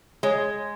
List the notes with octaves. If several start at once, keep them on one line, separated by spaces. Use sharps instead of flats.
G#3 C#5